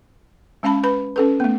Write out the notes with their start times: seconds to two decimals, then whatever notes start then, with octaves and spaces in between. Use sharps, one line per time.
0.63 G#3 C#4 F5 A5 B5
0.84 B4 B5
1.16 C#4 A4 B4
1.40 A3 B3